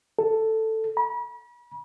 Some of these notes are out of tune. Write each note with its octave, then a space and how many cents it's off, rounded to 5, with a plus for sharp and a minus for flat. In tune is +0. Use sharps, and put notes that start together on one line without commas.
A4 +5
B5 -40